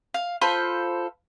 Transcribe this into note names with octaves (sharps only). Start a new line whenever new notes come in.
F5
F4 A4 C5 B5